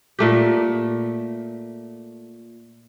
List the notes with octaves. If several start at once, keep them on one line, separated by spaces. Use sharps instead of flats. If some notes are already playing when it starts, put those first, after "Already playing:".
A#2 A3 G4